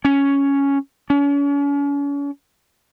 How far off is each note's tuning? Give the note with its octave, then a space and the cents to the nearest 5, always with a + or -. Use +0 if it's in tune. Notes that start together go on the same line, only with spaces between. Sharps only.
C#4 +5
C#4 +40